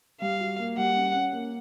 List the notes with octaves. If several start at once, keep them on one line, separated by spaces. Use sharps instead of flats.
G3 F5
F#4
A#3
G3 F#5
C#4
C#4
A#3